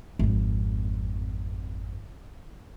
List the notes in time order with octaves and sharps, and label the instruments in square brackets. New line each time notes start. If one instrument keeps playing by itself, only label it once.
[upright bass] G#1 F2